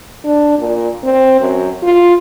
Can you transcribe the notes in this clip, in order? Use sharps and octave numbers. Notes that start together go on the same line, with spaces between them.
D4
A#2
C4
F#2
F4